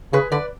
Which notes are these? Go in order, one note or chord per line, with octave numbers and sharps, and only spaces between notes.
C#3 G#4 B4
D3 B4 D5